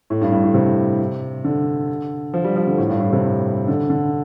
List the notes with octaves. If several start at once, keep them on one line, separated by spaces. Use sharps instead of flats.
A2
G2
G2
A2
C3
D3
F3
G3
F3
D3
A2
G2
A2
C3
D3
D3